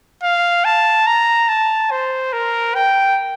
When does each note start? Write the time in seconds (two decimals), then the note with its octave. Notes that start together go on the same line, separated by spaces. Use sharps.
0.23 F5
0.65 A5
1.07 A#5
1.49 A5
1.91 C5
2.33 A#4
2.75 G5